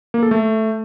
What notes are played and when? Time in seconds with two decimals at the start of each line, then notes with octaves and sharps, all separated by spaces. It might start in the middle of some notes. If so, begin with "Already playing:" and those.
0.14 A#3
0.23 A4
0.31 A3